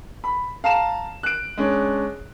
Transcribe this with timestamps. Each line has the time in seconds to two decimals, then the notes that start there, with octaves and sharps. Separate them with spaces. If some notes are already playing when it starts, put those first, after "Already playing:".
0.24 B5
0.64 F5 A5 A#5 E7
1.23 F#6 D7
1.57 G#3 C#4 D4